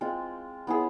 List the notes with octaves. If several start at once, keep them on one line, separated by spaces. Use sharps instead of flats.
G#3 C4 F4
B3 E4 G#4 C#5